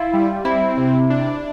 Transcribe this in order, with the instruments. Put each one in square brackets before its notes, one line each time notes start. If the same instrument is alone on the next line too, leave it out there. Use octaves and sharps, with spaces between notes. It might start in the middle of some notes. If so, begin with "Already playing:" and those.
Already playing: [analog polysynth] E4 [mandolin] F4
[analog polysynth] G3
[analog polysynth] C4 [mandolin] E4
[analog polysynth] C3
D4